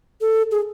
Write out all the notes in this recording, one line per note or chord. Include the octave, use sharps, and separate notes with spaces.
A4
G#4